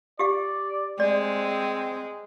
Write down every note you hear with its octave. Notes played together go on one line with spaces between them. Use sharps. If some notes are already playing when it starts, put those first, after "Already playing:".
G4 D5 F5
G#3 C4 D5